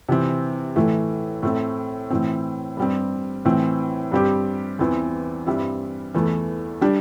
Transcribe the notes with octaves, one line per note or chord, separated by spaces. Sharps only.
C3 E3 C4
A2 E3 A3
A2 A3 C4
A2 E3 C4
G2 G3 C4
A2 E3 C4
G2 G3 C4 G4
E2 E3 C4
G2 G3 C4 E4
E2 E3 A3
G3 D4 G4